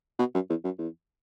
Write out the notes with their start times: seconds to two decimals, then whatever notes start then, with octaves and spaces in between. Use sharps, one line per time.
0.19 B2
0.34 F#2
0.50 E2
0.65 F#2
0.78 E2